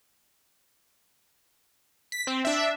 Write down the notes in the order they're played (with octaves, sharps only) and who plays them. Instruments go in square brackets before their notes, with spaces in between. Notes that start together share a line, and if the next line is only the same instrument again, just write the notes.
[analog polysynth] B6
C4
D4 E5